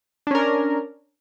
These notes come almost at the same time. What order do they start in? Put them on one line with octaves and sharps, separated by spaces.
D4 C#4 A#4